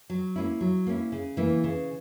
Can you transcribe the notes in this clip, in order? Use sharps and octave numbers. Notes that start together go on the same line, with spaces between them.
F#3
A#3 C#4 E4
F#3
A#3 C#4 E4
C#3
E3 A#3 E4
C#3